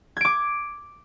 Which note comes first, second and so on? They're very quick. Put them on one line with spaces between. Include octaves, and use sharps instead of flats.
G#6 D7 D6